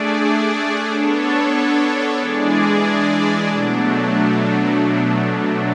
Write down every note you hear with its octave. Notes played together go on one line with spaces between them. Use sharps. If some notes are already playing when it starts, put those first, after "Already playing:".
Already playing: A3 D4 G#4 D5
B3 D4 A4 C#5
E3 G#3 D4 G#4 D5
B2 F#3 A3 D4